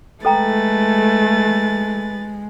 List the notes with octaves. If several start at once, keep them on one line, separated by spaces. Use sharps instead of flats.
G#3 A3 A4 B4 G5 A#5 A6